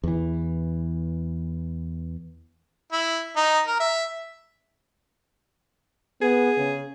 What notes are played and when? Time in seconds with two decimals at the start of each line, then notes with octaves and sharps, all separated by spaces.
0.04 E2 E3
2.93 E4
3.37 D#4
3.67 A#4
3.80 E5
6.22 B3 G#4
6.58 C#3